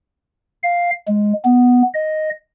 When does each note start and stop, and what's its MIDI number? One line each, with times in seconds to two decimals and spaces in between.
0.63 0.91 77
1.08 1.33 56
1.45 1.82 59
1.94 2.30 75